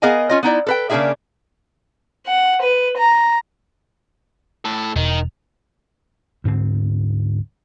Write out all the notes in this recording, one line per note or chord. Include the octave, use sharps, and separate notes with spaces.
B3 G#4 A#4 D#5 F5 G#5
C#4 F4 D#5
B3 D#4 E4 D5
A4 B4 G5
C#3 A#3 D4 E4 G#4 E5
F#5
B4
A#5
A2 A4
E1 D#3
D2 G#2 D3 C4